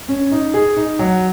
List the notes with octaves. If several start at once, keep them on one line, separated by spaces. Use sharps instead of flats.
C#4
D#4
G#4
D#4
F#3